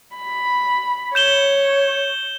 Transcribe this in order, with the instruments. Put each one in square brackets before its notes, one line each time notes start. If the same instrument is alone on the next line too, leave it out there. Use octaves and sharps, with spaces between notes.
[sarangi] B5
[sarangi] C#5 [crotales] G6 E7 G7